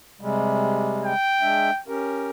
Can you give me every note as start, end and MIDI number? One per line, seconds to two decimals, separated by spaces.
0.21 1.14 48
0.21 1.14 55
0.21 1.14 56
1.05 1.81 79
1.41 1.70 56
1.41 1.70 62
1.41 1.70 76
1.88 2.31 61
1.88 2.31 67
1.88 2.31 70